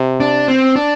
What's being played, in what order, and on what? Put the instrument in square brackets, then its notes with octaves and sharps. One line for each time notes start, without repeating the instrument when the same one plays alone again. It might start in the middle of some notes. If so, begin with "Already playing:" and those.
Already playing: [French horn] C3
[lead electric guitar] D4
C4
D4